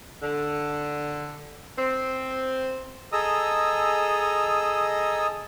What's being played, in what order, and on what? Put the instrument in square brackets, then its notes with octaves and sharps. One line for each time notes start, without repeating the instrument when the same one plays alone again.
[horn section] D3
C4
[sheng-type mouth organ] G#4 A4 D#5 A#5 D#6 E6